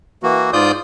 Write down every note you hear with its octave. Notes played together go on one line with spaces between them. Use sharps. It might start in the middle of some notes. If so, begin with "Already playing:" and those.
E3 A#3 F#4
G#2 F4 D5 D#6 G6